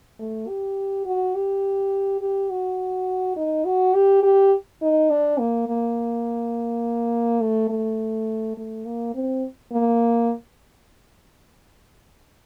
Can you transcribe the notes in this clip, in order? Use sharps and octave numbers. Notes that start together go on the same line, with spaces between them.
A3
G4
F#4
G4
G4
F#4
D#4
F#4
G4
G4
D#4
D4
A#3
A#3
A3
A3
A3
A#3
C4
A#3